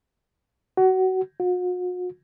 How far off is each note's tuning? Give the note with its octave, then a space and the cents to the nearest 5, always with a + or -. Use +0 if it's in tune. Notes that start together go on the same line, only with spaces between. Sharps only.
F#4 +25
F#4 -40